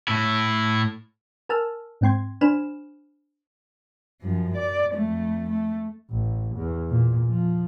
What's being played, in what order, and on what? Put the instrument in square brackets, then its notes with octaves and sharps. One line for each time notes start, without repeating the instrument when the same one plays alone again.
[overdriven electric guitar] A2 E4
[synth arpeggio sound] A#4 G#5 A5 E6 F6
G#2 C4 G5 C6 G#6
D4 C5 G#5 B5 F6 E7
[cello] F#2 F3
D5
F2 A3
A3
[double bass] A1
E2
A#2
F3